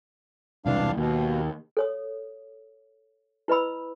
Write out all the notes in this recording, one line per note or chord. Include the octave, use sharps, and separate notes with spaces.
E1 C2 E3 D4 F5
D#2 B2
A4 C#5 D#6
E4 B4 D#5 B5 E6